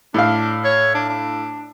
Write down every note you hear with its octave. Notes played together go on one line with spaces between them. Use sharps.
A2 D4 F5
C#5
D4
D4